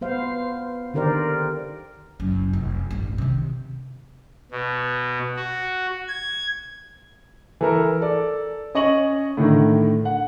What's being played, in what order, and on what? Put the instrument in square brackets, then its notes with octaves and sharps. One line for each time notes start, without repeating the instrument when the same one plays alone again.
[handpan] B3 C5 F5
D3 D#3 G4 A#4 C5 D5
[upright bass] F#1 F#2
F1 C4
A1 G2
C3 D#3
[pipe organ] B2
F#4
G#6
[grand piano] E3 A4 A#4
A4 D5
C#4 D#5 C#6 F#7
A2 D3 D#3
F#5